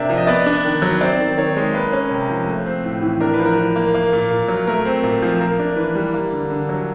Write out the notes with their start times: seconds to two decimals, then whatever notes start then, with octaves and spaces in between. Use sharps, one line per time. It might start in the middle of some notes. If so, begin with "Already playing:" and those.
Already playing: C3 A#3 D4 D5 E5
0.10 F3
0.17 D#5
0.27 B3 D5
0.46 D4
0.64 D#3
0.82 F#3
1.01 C4 D5
1.20 D#3
1.37 D#3 C#5
1.57 G#3
1.74 A#3 B4
1.93 C#4
2.11 C3
2.29 F3
2.47 A3
2.66 C4
2.84 A2
3.02 E3
3.20 D4 A#4
3.34 B4
3.40 F3
3.45 A#4
3.58 F3
3.76 A#3
3.95 A#3
4.13 A#2
4.30 A#2
4.48 F#3
4.67 A3 A#4
4.85 C4
5.03 A#2
5.22 F3
5.40 A#3 A#4
5.59 D4
5.77 E3 B4
5.95 G3
6.14 A#3
6.32 D3
6.50 D3
6.69 F#3